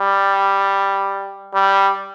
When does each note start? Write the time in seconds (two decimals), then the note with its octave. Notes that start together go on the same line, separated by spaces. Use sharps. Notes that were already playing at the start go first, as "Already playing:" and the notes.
Already playing: G3
1.54 G3